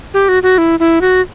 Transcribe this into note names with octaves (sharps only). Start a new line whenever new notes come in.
G4
F#4
F#4
E4
E4
F#4